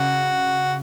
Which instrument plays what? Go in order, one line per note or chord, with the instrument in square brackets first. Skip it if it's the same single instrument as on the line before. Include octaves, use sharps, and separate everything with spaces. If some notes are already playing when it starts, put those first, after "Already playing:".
Already playing: [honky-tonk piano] C#3 [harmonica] F#4